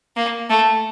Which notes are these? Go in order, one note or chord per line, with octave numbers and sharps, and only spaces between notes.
A#3
A3